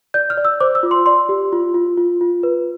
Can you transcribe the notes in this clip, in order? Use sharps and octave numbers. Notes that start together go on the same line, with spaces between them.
D5 G6
F6
D5
E6
C5 D6
E6
F4
C6
D5 C6
G4
F4
F4
F4
F4
B4